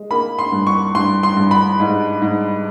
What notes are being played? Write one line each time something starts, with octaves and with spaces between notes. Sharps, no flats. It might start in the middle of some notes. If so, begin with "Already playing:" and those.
Already playing: G#3
A#3 B5
C6
G2
C#6
G2 C6
C6
G2
B5
G#2
G#2